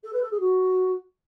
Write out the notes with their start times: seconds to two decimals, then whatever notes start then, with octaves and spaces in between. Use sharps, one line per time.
0.03 A4
0.12 B4
0.21 A4
0.30 G#4
0.40 F#4